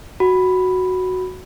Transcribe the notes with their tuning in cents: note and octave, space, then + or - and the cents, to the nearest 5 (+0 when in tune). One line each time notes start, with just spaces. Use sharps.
F#4 +0 B5 +0